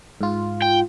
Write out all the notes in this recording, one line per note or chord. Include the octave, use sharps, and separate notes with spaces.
G#2 F4
G5